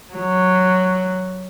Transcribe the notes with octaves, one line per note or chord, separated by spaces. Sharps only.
F#3